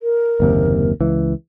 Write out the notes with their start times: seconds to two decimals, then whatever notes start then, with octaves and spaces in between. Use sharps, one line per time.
0.01 A#4
0.40 F#1 D#2 C3
1.00 C#2 E3